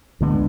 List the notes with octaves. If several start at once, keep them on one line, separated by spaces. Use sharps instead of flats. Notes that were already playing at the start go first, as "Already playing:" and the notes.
D2 D3 G#3 B3